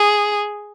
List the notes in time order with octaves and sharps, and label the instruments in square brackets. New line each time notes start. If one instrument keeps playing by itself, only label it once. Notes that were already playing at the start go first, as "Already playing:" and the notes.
Already playing: [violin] G#4